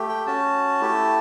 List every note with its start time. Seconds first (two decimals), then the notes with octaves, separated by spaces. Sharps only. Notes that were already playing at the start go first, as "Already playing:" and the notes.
Already playing: A3 G4
0.09 G5
0.27 C#4 F#4 A5
0.81 A3 E4 G4